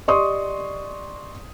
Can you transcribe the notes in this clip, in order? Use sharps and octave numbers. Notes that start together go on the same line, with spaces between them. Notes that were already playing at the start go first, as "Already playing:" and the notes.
G4 D5 D#5 C6 C#6 D#6